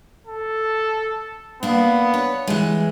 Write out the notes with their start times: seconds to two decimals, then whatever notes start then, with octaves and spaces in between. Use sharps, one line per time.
0.27 A4
1.63 A#3 B3 D4
2.14 C#5
2.47 E3 G#3